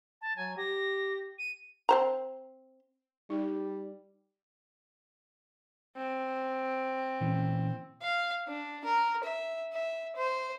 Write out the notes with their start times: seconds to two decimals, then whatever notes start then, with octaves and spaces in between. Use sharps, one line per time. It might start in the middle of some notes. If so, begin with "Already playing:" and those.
0.21 A5
0.37 F#3 G#5
0.57 G4 A#6
1.39 D#7
1.89 C4 C5 A#5
3.30 G3 D#4
5.97 C4
7.21 A#2 E3 C#4
8.02 F5
8.47 D4
8.85 A#4
9.24 E5
9.73 E5
10.16 C5